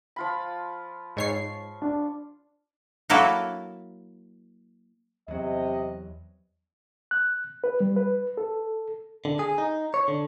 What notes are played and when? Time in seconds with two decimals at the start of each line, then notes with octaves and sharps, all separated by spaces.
0.16 F3 F4 B5
1.17 G#2 C#5 C#6 C7
1.82 D4
3.10 F#3 A#3 E4 F#4 A4
5.28 E2 C3 F#3 D#5
7.11 F#6
7.64 B4
7.80 G3
7.96 B4
8.37 A4
9.25 D3
9.39 G#4
9.58 D#4
9.94 C#5
10.08 D3